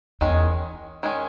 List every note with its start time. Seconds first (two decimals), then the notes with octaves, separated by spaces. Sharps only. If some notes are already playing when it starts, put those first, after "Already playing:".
0.21 E2 D#3 G#3 C#4
1.03 D#3 G#3 C#4